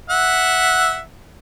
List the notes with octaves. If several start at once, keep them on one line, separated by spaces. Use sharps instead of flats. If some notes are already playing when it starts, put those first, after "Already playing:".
E5 F#5